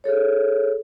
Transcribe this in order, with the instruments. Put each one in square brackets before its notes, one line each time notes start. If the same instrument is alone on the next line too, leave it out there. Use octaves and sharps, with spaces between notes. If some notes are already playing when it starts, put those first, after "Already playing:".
[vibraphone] G#4 A4 C#5